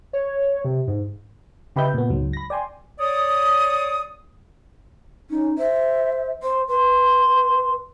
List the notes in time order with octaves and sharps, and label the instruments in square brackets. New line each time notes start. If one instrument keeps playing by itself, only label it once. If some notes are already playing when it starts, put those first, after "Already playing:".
[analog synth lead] C#5
C3
G#2
[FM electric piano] C#3 G4 B4 D#5 E5 G6
A#2 B3
C#2 G#2 F#3
B5 A#6
D5 G5 G#5 C6
[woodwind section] C#5 D5 D#6
[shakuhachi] C#4 [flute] D#4
[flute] C5 [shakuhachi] E5
[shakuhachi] C5 [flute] C6
[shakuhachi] B4 [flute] C6